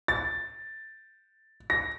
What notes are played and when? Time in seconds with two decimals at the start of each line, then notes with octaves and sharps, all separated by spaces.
0.08 A6
1.70 A#6